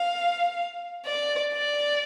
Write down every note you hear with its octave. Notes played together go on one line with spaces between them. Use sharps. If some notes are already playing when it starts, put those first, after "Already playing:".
Already playing: F5
D5
D5